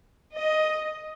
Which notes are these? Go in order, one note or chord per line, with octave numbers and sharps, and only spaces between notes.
D#5